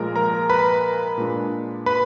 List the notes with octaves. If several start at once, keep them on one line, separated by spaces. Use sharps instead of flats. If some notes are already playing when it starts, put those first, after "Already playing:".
Already playing: A#2 F3 G#3 A#4 A#5
A#4 A#5
B4 B5
A#2 G#3 D4
B4 B5